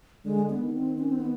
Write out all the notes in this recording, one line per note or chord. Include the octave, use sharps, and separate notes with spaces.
D3 G#3
B3
D#3
C#4
C4
C#4
C4
B3